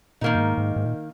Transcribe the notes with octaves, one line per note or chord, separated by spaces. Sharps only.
A#2 D#3 A#3 D#4
F#2
G#2
G#2
G#2
A#2